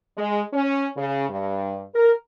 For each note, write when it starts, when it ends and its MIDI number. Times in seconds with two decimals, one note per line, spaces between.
0.17 0.42 56
0.53 0.87 61
0.97 1.28 49
1.29 1.81 43
1.94 2.13 70